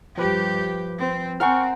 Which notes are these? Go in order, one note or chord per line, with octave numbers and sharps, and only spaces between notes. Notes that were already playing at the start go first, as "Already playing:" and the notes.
G2 F3 G4 B4
C4
C4 A#4 F#5 G#5 C#6 F6